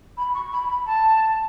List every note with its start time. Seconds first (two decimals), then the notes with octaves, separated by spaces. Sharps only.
0.17 B5
0.35 C#6
0.52 B5
0.69 B5
0.86 A5